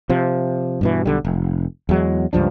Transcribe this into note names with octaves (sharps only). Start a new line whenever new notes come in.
C3 F3
G2 B2 E3
B1 D3 G3
F1
E2 F#3 G#3
C#2 G2 F3 D4